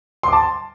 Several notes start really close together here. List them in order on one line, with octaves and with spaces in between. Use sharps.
C6 D6 A5